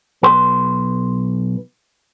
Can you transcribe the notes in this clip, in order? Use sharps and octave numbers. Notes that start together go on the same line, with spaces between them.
B1 B4 C6